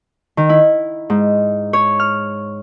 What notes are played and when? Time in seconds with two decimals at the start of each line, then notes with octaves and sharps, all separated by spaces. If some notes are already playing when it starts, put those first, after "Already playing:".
0.37 D#3
0.49 E4
1.10 G#2
1.73 C#5
2.00 F6